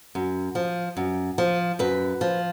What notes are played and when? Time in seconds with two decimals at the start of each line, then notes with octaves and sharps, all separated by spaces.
0.15 F#2
0.55 F3
0.97 F#2
1.38 F3
1.79 F#2 B4
2.21 F3